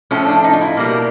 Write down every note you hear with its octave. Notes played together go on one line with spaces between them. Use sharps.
A2 F3 A3 C#4
D4
D#4
F4
E4
B2 G3 A#3